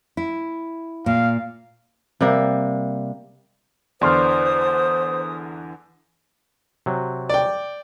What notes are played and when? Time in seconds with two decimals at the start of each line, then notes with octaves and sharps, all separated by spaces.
0.17 E4
1.06 A#2 F5
2.21 C3 G3 A#3
4.01 E2 D3 E3 C5 D5 C6 D#6 F6
6.86 C3 F#3
7.29 D5 G5